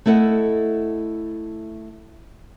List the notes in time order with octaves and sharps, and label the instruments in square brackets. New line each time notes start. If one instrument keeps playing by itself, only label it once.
[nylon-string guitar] A3 E4 A4 D#5 F#5